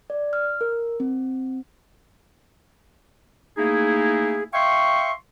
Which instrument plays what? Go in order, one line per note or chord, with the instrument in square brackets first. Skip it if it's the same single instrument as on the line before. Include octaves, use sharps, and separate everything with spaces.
[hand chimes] D5
F6
A#4
C4
[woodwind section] A3 A#3 D#4 E4 G#4
E5 F5 G5 C6 C#6